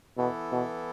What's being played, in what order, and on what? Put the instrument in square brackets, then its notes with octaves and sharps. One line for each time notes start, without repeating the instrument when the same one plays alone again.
[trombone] B2 [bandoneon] E3 B3 E4 A4
[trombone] B2